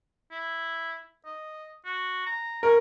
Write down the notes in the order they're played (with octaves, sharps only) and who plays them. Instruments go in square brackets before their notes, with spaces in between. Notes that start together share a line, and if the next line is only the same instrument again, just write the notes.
[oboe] E4
D#5
F#4
A#5
[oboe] C#4 [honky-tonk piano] A#4